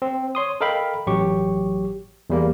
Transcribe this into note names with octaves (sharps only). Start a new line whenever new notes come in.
C4
C#5 C6 D#6
A4 A#4 D#5 F5 G5 B5
A1 F#3 G4 C#6
E2 G3 A#3